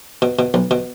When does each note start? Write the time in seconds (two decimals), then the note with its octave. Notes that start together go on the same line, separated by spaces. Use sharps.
0.22 B2
0.39 B2
0.54 B1
0.71 B2